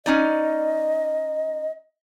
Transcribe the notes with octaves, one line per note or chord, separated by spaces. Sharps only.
C#4 D#4 D5 D#5